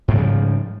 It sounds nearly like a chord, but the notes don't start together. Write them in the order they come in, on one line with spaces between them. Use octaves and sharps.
G#2 G3 C#3 F3